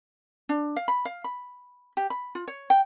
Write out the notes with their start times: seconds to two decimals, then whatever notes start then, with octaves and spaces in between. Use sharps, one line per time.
0.49 D4
0.76 F5
0.88 B5
1.05 F5
1.24 B5
1.97 G4
2.10 B5
2.35 F4
2.48 C#5
2.70 G5